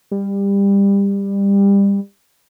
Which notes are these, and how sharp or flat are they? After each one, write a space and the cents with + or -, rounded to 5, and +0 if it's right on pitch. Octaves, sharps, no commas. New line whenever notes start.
G3 +25